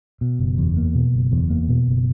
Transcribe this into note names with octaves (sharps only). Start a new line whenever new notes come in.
B2
F#1
E2
A#3
B2
F#1
E2
A#3
B2
F#1